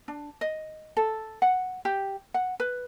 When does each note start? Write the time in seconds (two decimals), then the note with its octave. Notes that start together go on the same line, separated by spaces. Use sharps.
0.08 D4
0.41 D#5
0.97 A4
1.42 F#5
1.85 G4
2.34 F#5
2.60 B4